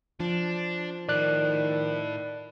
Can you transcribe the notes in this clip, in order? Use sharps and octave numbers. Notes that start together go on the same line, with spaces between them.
F3 D4
A2 D#3 D5 F#6